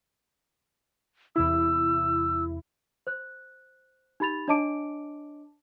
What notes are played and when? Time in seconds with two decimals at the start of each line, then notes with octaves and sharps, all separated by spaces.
1.36 E2 C3 E4 E6
3.07 C5 F#6
4.20 D#4 G4 B5 A6 F7
4.48 D4 C#5 D#5 A5 D6 D7